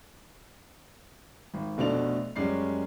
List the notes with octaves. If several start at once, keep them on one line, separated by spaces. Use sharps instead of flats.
G#1
F1 B2 A3 D4 D5 F7
F#2 G3 G#3 C#4 D5 C7